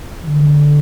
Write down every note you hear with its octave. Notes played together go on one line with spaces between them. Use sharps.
E3
D3